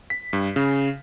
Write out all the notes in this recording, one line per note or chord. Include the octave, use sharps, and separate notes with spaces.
B6
G2
C#3